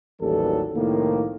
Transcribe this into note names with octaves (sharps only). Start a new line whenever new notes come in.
A1 D#2 E3 F#3 G3 A4
C2 A2 D#3 F3 A#3